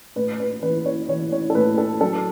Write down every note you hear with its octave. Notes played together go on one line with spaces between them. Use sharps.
A2 B4
B4
E3 B4
C#5
E3 C#5
C#5
A4
A2 B4
A4
F#3 A4